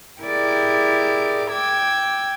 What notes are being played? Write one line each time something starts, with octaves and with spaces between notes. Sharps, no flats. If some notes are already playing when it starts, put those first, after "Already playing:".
E4 G4 G#4 A#4 D5
G5 D6 E6 G#6